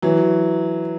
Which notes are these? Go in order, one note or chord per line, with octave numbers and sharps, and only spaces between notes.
E3 F#3